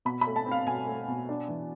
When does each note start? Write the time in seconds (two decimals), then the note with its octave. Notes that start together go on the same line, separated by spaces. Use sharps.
0.05 B2 B5
0.21 B5
0.27 A3
0.36 A5
0.46 C4
0.51 F5
0.67 B2 G#5
0.87 A3
1.08 B2
1.29 D4
1.48 E3